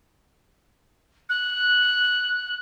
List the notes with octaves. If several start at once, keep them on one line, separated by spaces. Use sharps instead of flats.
F#6